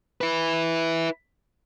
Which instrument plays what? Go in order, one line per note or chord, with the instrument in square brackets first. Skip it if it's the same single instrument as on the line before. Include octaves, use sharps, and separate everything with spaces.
[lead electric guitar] E4 B4